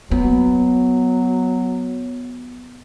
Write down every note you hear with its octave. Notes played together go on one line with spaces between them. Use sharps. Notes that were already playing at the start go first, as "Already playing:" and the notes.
F#3 B3